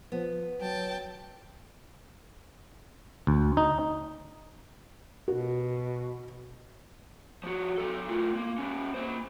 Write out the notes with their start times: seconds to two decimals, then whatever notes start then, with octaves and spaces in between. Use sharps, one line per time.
0.12 F3 B3
0.61 F#3 G5 A5
3.27 D2
3.57 D#4
5.28 B2 F#4
7.44 F3 F#4
7.78 F#3 A4
8.08 A2 F4
8.36 A#3
8.58 G3 C#4
8.94 A#3 C5